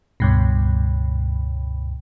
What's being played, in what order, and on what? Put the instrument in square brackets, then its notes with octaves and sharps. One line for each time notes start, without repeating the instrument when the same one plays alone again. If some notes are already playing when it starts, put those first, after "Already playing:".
[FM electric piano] C#2 G2 B2